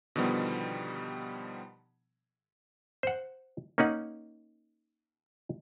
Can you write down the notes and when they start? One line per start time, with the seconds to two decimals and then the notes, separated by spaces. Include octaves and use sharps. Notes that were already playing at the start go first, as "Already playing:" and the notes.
0.16 B2 D3 D#3 F3 G3 B3
3.03 C5 F#5
3.78 A#3 C#4 D#4 F#5